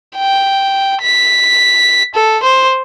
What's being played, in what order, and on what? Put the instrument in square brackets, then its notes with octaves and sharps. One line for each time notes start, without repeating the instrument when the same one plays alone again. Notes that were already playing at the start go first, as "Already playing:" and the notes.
[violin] G5
B6
A4
C5